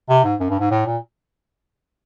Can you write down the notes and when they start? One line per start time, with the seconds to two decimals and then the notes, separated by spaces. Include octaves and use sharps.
0.09 C3
0.24 G#2
0.40 F#2
0.50 G2
0.60 G#2
0.71 A2
0.86 A#2